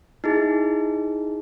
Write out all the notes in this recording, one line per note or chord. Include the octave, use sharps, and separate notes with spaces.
D#4 E4 G#4